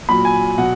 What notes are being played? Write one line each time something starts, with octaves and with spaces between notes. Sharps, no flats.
A#2 F#3 B5
G#5
B2 F#3 F#5